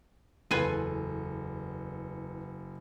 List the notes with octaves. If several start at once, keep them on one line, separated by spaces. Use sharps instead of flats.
F#1 E2 F4 A4 B4 G#5 D#7